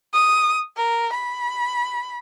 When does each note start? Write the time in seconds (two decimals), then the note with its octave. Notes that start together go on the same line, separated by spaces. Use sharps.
0.13 D#6
0.77 A#4
1.13 B5